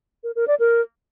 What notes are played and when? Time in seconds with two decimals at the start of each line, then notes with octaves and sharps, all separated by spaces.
0.24 A#4
0.36 A#4
0.48 D5
0.59 A#4